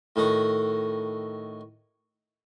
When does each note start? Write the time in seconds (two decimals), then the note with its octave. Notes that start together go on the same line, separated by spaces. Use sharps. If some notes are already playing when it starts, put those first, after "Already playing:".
0.16 A2 D#3 F#4